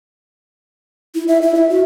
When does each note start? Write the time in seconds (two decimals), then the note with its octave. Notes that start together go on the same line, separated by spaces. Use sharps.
1.15 E4
1.28 E5
1.42 E4
1.55 E5
1.70 F#4